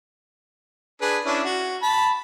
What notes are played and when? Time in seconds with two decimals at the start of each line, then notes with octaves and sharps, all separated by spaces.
1.01 D4 G#4 B4
1.25 C#4 D4 E4
1.44 F#4
1.82 A5 B5